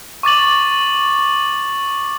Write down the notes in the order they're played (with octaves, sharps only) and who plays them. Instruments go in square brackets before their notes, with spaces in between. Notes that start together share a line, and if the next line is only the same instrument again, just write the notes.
[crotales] C#6 D6 A6 F#7